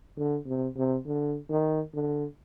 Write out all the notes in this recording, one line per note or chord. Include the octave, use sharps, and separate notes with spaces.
D3
C3
C3
D3
D#3
D3